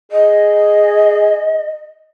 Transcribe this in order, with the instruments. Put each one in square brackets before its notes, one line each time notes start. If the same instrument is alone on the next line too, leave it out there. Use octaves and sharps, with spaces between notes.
[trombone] G#4 [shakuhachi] D#5